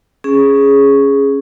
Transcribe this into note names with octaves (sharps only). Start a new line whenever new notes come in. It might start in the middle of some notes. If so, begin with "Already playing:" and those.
C#4 G#4